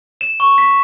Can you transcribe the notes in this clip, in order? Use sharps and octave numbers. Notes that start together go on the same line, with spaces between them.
E7
C#6
B6